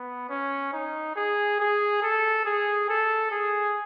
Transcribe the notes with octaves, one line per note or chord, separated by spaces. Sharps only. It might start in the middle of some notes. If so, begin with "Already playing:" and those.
Already playing: B3
C#4
D#4
G#4
G#4
A4
G#4
A4
G#4